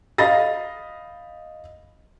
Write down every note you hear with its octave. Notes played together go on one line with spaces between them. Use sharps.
D#5 F5 B5 A6 A#6